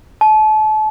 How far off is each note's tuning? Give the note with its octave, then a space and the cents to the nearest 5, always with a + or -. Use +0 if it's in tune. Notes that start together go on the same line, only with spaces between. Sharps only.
A5 -35